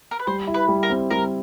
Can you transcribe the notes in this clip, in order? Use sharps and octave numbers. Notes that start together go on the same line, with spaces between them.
A#4
B4
G3 C5
E4
B4
G3
A#4
C4
G3 A#4